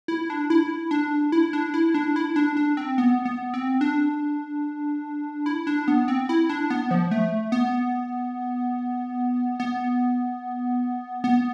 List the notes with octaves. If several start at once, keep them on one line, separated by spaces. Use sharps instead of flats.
E4
D4
E4
D4
E4
D4
E4
D4
E4
D4
D4
C4
B3
B3
C4
D4
E4
D4
B3
C4
E4
D4
B3
F3
A3
B3
B3
B3